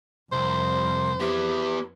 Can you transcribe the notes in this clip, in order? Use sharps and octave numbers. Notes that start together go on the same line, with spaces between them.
C2 F2 C5
B3 E4 G4